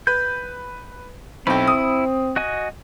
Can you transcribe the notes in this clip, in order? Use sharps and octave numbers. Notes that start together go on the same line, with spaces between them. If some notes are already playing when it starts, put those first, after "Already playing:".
B4 G6
B1 C4 E4 G5 B5
D#6
F#4 D#5 G#5